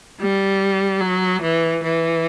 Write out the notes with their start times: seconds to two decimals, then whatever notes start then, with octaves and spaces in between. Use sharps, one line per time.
0.20 G3
1.01 F#3
1.42 E3
1.83 E3